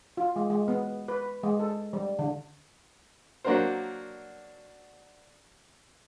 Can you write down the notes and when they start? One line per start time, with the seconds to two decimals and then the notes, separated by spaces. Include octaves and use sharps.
0.17 F4
0.36 G#3
0.50 G#3
0.68 B3
1.08 B4
1.43 G#3
1.59 A4
1.93 G3
2.19 D3
3.44 F#3 A#3 D4 F#4 A#4 C5